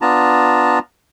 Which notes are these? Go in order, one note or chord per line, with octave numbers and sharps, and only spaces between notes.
B3 D4 F4 A5 A#5